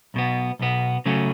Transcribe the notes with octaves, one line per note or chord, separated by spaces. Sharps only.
B1 B2 B3
B1 B2 B3
C#3 F#3 A3 C#4